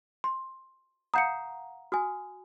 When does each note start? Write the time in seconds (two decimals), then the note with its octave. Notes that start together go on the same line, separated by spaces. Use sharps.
0.24 C6
1.14 F5 F#5 A#5 D#6 G6 C#7
1.92 F#4 G#5 D#6 F6